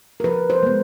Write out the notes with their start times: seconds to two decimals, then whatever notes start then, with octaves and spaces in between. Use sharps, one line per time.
0.20 A#4
0.24 F3 B4
0.50 C5
0.63 G#3 B3